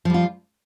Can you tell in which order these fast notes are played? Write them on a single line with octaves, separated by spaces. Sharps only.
F3 G3 F4